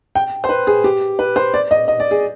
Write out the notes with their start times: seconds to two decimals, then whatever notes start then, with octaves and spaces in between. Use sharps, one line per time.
0.15 G5
0.44 C5
0.49 B4
0.67 G#4
0.84 G4
1.19 B4
1.36 C5
1.54 D5
1.71 D#5
1.88 D#5
2.00 D5
2.11 G#4